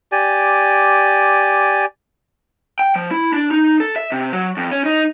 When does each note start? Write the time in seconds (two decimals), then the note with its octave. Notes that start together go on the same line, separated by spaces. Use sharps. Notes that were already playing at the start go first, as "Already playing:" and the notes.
0.12 G4 D5 G#5
2.79 G5
2.96 F3
3.11 E4
3.33 D4
3.51 D#4
3.80 A4
3.96 E5
4.12 C3
4.32 F#3
4.57 F2
4.72 C#4
4.85 D#4